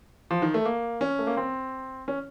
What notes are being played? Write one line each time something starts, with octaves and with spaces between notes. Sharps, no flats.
F3
D#3
A3
A#3
C#4
A3
A#3
C4
C#4